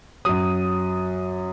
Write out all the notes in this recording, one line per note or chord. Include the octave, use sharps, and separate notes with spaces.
F#2 F#3 D#6